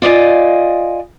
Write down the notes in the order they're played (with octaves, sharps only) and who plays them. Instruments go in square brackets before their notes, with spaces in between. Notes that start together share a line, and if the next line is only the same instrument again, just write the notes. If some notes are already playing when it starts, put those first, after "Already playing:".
[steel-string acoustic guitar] F4 D5 D#5 G#5